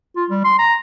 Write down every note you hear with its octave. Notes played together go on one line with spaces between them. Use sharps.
F4
G3
C6
A#5